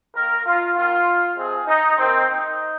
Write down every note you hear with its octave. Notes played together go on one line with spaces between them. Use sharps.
D#3 A#3 A#4
F4
D#3 A#3 F4
C3 F3 G#3 C4 G#4
D#4
C3 D#3 A#3 C4
D#4